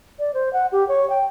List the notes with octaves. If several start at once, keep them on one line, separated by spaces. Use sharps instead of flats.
D5
C5
F#5
G4
C#5
G5